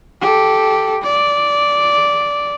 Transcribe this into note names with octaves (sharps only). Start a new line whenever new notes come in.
G4 A4
D5